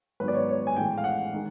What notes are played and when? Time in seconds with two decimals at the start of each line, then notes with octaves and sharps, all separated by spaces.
0.20 G#2 D#3 F#3 B3 B4
0.28 D5
0.34 C#5
0.49 C#5
0.67 G#5
0.76 A2 E3 G#3 G5
0.98 F5
1.04 F#5
1.33 D#3 G#3